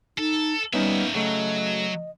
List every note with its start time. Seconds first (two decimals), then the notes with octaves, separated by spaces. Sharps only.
0.18 D#4 A4
0.73 G3 A#3 B3 C#4 D#4 E5
1.15 C#3 F#3 A3 D#5